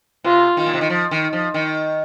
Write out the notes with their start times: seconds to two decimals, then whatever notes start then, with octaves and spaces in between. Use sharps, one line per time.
0.24 C3 F4
0.57 D#3
0.66 A#2
0.73 C3
0.81 D#3
0.90 F3
1.11 D#3
1.33 F3
1.54 D#3